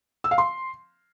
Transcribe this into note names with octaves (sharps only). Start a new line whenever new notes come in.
E6
F5
C6